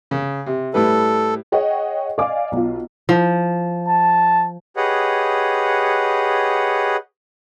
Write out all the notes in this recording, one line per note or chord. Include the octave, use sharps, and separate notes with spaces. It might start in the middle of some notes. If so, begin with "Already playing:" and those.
C#3
C3
A2 G3 A4 B4
G#4 C#5 D#5 F#5 G5
D5 D#5 F5 G#5 D6
B1 F4
F3
A5
G4 G#4 B4 C#5 D#5 F#5